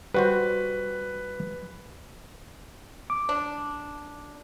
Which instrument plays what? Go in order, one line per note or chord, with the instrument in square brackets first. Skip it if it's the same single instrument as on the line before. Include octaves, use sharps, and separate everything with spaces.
[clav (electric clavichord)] G3 F#4 C5 [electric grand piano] B4
[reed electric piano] D6
[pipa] D4